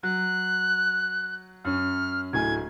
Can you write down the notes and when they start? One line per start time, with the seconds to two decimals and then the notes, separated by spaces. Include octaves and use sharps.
0.03 F#3 F#6
1.65 F#2 C#4 F6
2.33 D1 A2 G#5 G#6